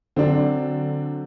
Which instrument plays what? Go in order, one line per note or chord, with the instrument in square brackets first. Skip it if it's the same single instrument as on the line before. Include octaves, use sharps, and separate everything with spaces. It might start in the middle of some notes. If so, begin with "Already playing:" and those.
[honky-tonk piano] D3 F#3 [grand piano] C4 D4